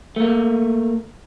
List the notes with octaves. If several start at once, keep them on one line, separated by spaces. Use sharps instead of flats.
A3 A#3